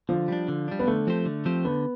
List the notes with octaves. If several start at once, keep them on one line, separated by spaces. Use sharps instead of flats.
D3 F3
G3 D4
D3
G3 D4
B3
D3 A3
F3 C4 G4 C5
D3
F3 C4 G4 C5
D3 B3